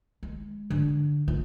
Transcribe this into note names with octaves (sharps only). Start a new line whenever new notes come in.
G#3
D3
F4